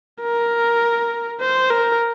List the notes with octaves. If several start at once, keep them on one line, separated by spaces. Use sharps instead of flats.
A#4
C5
A#4